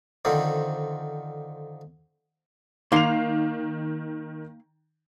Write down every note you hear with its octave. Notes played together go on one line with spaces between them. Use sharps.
F2 D3 D#3 C4
D#3 A#3 C6 C7 F7